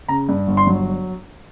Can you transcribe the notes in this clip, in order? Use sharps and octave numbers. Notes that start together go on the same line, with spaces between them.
C#3 A#5
G2
G1
C6
F#3